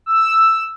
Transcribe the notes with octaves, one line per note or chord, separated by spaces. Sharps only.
E6